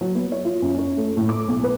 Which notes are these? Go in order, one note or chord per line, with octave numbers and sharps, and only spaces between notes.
F#3
B3
C#5
F4
F#2
C#4
A3
A2
D6
B1
B4